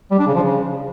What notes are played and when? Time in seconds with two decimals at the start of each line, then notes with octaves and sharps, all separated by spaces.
0.11 G3
0.19 D4
0.27 C#3
0.35 F3
0.43 C#3